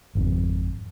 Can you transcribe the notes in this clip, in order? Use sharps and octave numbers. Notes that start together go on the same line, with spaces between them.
G#1 F2